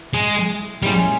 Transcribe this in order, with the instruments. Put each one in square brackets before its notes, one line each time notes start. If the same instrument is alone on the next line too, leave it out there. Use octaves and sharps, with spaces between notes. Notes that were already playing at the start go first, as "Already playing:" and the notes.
Already playing: [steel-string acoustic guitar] E3 E4
[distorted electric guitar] G#3
[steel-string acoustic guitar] A#2 G#3 C#4 E4 G#4 [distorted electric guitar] G3